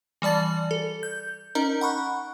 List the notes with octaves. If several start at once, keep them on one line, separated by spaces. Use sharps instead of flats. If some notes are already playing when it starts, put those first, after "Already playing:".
E3 G3 D5 A5 A6
A4
G6
C#4 D#4 A#4 D#5 A#5
F#5 B5 C#6 F#6